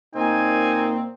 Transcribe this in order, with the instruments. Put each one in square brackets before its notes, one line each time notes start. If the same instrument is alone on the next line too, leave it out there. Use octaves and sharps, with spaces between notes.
[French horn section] A#2 A#3 [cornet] C4 [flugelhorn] D#4 [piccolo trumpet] G#5